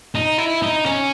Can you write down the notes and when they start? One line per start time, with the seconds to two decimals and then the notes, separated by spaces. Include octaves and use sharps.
0.15 D#4
0.38 E4
0.62 D#4
0.86 C#4